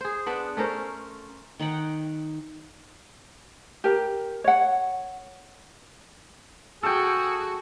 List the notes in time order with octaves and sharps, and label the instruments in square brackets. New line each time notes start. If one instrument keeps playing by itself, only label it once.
[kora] G#4 C5
B3 D4 B4
A3 C#4 A#4 C5
[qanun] D#3 D#4 F#5 G5
[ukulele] G4 A#4
C#5 F#5
[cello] F#4 [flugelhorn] G#4 [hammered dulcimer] A4 G5